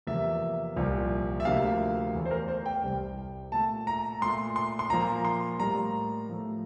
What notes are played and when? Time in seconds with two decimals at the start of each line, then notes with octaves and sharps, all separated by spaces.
0.07 E2 C3 F3 A#3 E5
0.76 C2 A#2 F3
1.40 E5
1.45 D2 C3 F3 A#3 F5
2.14 E2 E3 A3
2.26 C5
2.31 A#4
2.48 C5
2.66 G5
2.83 C2 C3 G3
3.52 A#2 A3 A5
3.87 A#5
4.21 A#2 A3 C6
4.56 C6
4.79 C6
4.90 A#2 F3 A#3 A#5
5.25 C6
5.59 A2 G3 A#3 A#5
6.29 A2 F3 A3